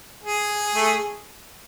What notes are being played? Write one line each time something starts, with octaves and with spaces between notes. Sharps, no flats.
G#4
A3